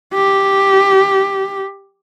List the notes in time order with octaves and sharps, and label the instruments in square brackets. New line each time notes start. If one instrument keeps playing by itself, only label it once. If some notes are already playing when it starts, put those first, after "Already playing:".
[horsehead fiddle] G4